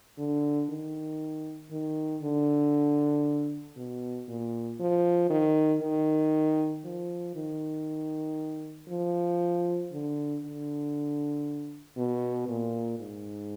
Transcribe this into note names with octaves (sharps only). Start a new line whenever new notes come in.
D3
D#3
D#3
D3
B2
A#2
F3
D#3
D#3
F3
D#3
F3
D3
D3
B2
A#2
G#2